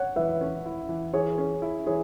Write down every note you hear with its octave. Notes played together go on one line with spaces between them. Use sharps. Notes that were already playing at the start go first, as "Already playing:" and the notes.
Already playing: C#5 F#5
E3 B4 E5
C#4
E4
E3
E3 G#4 C#5
C#4
E4
E3 G#4 C#5